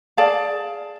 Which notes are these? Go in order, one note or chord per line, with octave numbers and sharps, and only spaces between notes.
G#4 D5 F5 A5